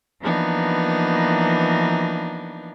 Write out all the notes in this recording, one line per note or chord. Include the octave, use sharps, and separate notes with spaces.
E3 F3 A#3 B3 D4 D#4